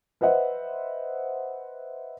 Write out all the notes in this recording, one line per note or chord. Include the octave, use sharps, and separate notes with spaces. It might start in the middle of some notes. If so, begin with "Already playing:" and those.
B4 C5 D#5 E5 F#5